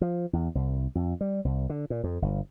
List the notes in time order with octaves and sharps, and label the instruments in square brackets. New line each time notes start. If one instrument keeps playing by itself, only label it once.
[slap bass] F3
E2
C2
F2
G3
C2
D3
A#2
F2
G1